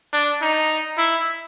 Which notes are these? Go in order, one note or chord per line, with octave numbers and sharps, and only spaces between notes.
D4
D#4
E4